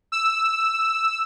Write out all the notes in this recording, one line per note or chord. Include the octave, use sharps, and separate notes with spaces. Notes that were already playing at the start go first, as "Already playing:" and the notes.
E6